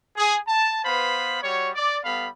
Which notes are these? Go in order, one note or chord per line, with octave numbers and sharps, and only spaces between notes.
G#4
A5
B3 B4 C5 F5 B5
G3 F#4 C#5
D5
G3 B3 A4 F5 B5